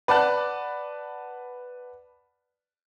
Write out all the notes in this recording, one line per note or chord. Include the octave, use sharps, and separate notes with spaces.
B4 D5 F#5 A5 F#6